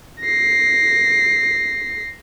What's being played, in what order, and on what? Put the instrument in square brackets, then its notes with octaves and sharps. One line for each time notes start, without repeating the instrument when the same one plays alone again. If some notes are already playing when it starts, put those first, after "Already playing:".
[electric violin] A#6 C7